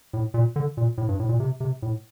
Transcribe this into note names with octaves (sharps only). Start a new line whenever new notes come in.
A2
A#2
D3
A#2
A2
G2
A2
A#2
C3
C3
A2